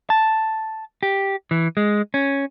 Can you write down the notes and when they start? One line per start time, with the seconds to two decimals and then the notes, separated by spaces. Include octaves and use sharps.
0.10 A5
1.03 G4
1.51 E3
1.77 G#3
2.14 C#4